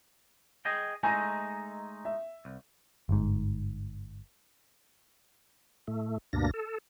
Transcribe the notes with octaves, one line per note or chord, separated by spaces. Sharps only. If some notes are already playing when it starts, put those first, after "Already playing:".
G#4 D#5 G5
G#3 A3 D#4 G#5 A#5
E5
C2
G1 G#2
A2 A3
D2 G2 B2 A#3 D4 A#6
A4